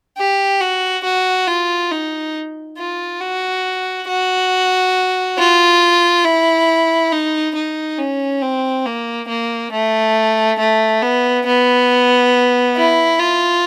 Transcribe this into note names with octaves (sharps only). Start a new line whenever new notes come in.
G4
F#4
F#4
F4
D#4
F4
F#4
F#4
F4
E4
D#4
D#4
C#4
C4
A#3
A#3
A3
A3
B3
B3
E4
F4